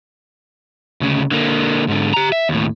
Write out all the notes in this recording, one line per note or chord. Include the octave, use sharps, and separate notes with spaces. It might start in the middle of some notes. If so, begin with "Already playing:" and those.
D2 C#3
D3 A#3
G#2 D3
G4 A#5
E5
D#2 A2